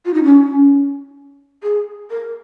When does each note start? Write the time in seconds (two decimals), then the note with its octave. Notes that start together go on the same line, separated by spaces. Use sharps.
0.06 F4
0.14 D#4
0.24 C#4
1.63 G#4
2.11 A#4